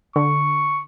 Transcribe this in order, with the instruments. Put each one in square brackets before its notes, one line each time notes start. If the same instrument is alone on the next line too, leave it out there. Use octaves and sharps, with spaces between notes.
[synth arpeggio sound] D3 [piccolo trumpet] C#6